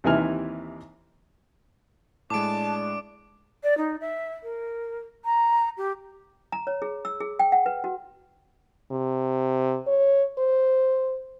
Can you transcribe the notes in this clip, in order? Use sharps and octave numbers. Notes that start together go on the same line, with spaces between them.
D#2 C3 E3 G#5 F6
A2 G#3 D4 A5 D6 D7
D5
D#4
E5
A#4
A#5
G4
A#5
C#5
G#4
E6
G#4
G5
F#5
B4
F#4
C3
C#5
C5